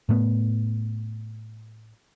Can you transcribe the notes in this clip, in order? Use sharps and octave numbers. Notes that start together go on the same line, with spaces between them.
A2 A3 B3